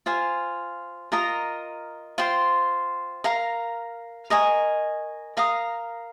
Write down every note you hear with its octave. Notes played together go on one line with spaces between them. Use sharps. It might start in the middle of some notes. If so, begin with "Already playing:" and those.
F4 C5 F5 G#5
F4 A#4 D#5 A#5
F4 C5 G5 C6
A#4 F5 A#5
A#4 D#5 G#5 C#6
A#4 F5 A#5 D#6